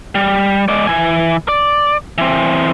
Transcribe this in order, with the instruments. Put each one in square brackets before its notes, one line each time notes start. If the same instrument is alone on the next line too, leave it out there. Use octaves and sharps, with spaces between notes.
[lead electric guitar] G3
G#3 D5
E3 G#5
D5
E3 C4